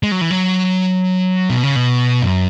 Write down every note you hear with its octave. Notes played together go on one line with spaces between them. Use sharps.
G#3
F#3
E3
F#3
B2
C#3
B2
F#2